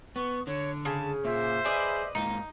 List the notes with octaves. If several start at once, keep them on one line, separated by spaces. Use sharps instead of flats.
B3 C#6
D3 C#5
C#3 G#5 A5
A#2 C5 E5
G#4 B4 D5 D#5
G#2 A#3 D#4